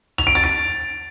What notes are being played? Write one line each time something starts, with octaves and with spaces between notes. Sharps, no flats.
F7
D7
A6
D7